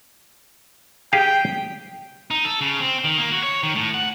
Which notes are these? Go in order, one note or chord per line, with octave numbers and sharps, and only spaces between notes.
G4 G#4 F5 G5
D#4
A4
C#3
C4
D#3
A#3
F#4
C#5
D#3
A2
F#5